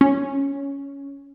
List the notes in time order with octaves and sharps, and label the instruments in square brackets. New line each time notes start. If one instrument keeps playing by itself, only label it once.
[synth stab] C#4